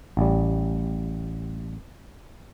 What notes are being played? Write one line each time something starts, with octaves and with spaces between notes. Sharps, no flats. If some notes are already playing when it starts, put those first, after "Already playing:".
A1 G3